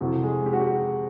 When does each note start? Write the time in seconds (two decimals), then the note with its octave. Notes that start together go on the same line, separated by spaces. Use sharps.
0.01 F2 C3 E3 F#4
0.23 G#3 G#4
0.46 G4
0.53 F#4
0.61 G4